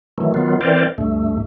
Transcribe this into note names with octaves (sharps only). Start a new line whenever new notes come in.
D#3 E3 F#3 A3
D#3 F#3 B3 F4
E3 C4 A#4 C5 D5
D2 G2 A3